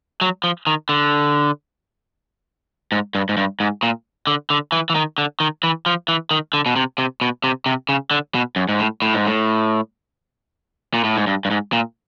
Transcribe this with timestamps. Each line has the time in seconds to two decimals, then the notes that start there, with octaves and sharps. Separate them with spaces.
0.21 F#3
0.44 F3
0.67 D#3
0.89 D3
2.92 G#2
3.15 G2
3.29 G#2
3.37 G2
3.60 G#2
3.83 A#2
4.27 D3
4.50 D3
4.72 E3
4.90 E3
4.95 D#3
5.18 D3
5.40 D#3
5.63 E3
5.86 F3
6.08 E3
6.31 D#3
6.53 D3
6.66 B2
6.76 C3
6.98 C3
7.21 B2
7.44 C3
7.66 C3
7.89 C#3
8.11 D3
8.35 B2
8.56 F#2
8.69 G#2
8.79 A2
9.02 A2
9.14 G#2
9.27 A2
10.94 A#2
11.04 A2
11.17 G#2
11.27 G2
11.45 G2
11.51 G#2
11.73 A#2